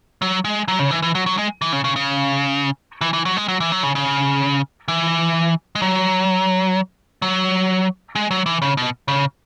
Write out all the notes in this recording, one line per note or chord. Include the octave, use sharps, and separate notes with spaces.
F#3
G#3
F#3
C#3
E3
E3
F#3
F#3
G#3
E3
C#3
C#3
C#3
E3
E3
F#3
G#3
F#3
E3
F#3
C#3
C#3
E3
G#3
F#3
F#3
G#3
F#3
E3
C#3
B2
C#3